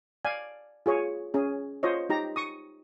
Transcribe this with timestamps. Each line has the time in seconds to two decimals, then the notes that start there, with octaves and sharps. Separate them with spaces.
0.25 D5 F5 G#5
0.86 F4 G#4 C#5
1.34 C#4 G#4
1.83 F4 C5 C#5 D#5
2.09 D#4 G4 A#5
2.36 C#6 D#6